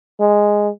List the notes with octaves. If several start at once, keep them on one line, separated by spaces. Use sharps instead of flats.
G#3